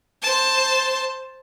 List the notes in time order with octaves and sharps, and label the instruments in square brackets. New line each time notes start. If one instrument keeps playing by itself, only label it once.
[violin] C5 A5